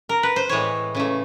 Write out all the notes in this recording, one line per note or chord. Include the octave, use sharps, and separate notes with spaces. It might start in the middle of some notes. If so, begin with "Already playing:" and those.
A#4
B4
C5
A2 E3 G#3 C#5
C#3 E3 A3